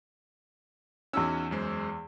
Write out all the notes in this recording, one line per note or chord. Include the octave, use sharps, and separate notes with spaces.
E2 C#4 D#4 F#4 E6
F#2 G#3 C5